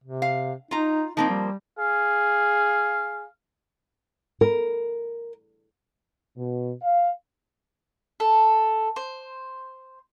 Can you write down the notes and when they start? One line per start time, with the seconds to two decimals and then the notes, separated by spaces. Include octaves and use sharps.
0.04 C3
0.22 F5
0.71 D#4 F4 A#5
1.17 F3 A#3 C4 D#4
1.29 G3
1.79 G#4 F5
4.41 A#4
6.37 B2
6.82 F5
8.20 A4
8.96 C5